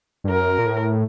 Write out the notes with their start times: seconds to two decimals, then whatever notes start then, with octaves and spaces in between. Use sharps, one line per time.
0.24 G2
0.29 F#2 A#4
0.59 A#2
0.66 A2